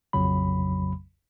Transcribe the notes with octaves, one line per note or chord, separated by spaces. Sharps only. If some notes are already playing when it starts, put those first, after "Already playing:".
A#1 F2 C#3 F#3 B5